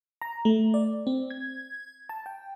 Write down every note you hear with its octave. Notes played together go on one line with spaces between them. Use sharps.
A#5
A3
D5
C4
G#6
A5
G5